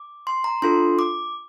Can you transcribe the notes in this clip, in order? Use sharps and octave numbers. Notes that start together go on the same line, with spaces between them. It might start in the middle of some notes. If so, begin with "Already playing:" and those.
Already playing: D6
C6
A#5
D4 F4 A4 C6
D6